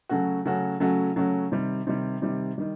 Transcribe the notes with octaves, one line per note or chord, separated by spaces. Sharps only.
C#3 F#3 A3 C#4 F#4
C#3 F#3 A3 C#4 F#4
C#3 F#3 A3 C#4 F#4
C#3 F#3 A3 C#4 F#4
C3 D#3 G3
C3 D#3 G3
C3 D#3 G3
D#3 G3